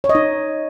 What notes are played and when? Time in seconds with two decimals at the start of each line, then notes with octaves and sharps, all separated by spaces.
0.04 C#5
0.09 D#5
0.15 D#4